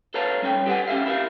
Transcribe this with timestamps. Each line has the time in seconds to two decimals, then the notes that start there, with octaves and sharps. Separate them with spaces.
0.14 A4 B4 C#5 F5 A5 A#5
0.42 G3 C#4 C#5 G5
0.66 G4 A4 B4 D#5 F#5 G#5
0.88 C#4 G4 E5 F5
1.06 E4 G4 A#4 E5 F5